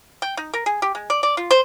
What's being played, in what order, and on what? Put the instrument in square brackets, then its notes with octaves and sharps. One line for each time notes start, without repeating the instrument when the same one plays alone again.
[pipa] G5
D#4
A#4
G#4
G4
G#3
D5
D5
F4
C5